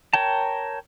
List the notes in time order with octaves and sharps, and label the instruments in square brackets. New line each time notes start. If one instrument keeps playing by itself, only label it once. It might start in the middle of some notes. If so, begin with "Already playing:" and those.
[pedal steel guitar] A#4 C#5 G5 A5